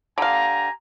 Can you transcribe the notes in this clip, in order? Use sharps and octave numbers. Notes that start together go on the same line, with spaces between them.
D3 G4 F5 G#5 A#5